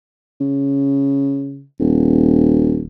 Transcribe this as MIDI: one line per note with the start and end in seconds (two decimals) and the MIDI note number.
0.40 1.64 49
1.80 2.85 27